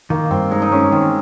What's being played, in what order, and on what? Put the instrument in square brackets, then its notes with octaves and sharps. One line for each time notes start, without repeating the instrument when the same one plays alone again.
[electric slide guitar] D#3 [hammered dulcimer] A#3
[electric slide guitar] G2 [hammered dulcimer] C4
[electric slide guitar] G#3 [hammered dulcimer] D#4
[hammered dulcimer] D#4
[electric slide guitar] G#3 [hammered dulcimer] C#4
[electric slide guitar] D#3 [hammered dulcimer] C4